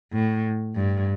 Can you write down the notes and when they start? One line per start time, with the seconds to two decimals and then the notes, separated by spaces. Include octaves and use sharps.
0.13 A2
0.75 G2